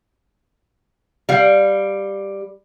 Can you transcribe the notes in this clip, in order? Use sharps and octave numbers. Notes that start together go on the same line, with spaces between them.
G3 F5